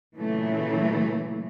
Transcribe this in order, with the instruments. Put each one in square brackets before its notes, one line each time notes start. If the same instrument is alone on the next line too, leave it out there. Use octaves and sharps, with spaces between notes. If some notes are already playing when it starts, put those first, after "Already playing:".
[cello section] A#2 C#3 E3 F#3 A3